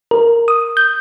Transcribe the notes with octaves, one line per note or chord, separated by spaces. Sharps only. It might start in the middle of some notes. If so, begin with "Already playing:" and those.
A#4
D#6
G6